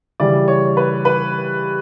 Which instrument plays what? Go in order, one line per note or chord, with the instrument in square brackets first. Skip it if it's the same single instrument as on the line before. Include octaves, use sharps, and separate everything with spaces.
[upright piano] C#3 E3 G3 D5
C#5
B4
B4